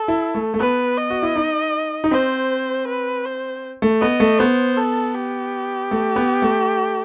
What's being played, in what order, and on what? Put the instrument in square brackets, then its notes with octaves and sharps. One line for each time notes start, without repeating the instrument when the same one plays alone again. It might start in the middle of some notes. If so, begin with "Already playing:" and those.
Already playing: [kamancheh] A4
[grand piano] E4
A3
A3
[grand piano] B3 [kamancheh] B4
[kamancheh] D#5
[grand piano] F#4
E4
D#4
D#4
[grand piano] C4 [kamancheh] C5
[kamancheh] B4
C5
[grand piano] A3
[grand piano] B3 [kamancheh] D#5
[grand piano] A3
[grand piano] B3 [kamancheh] C5
[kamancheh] A4
G4
[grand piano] A3
B3
A3